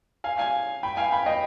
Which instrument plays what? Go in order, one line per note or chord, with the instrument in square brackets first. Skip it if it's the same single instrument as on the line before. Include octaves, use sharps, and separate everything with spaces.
[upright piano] F5 G#5
F5 G#5
G5 B5
F5 G#5
G5 B5
D#5 G5